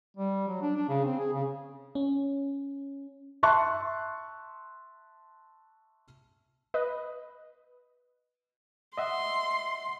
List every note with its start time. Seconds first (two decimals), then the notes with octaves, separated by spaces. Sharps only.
0.17 G3
0.49 F#3
0.62 D4
0.76 D4
0.89 C#3
1.05 C4
1.19 G#4
1.33 C#3
1.95 C#4
3.43 E5 A5 C6 C#6 F#6
6.74 B4 D#5
8.98 D#5 E5 F#5 C6